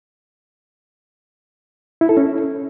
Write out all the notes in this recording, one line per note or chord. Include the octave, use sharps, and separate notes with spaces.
E4
A4
C#4